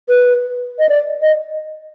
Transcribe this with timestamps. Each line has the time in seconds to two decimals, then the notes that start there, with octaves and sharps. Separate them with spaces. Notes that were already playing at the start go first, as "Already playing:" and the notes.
0.08 B4
0.78 D#5
0.89 D5
1.21 D#5